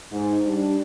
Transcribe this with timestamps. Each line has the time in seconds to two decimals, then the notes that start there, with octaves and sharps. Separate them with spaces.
0.12 G#2
0.46 G3 D4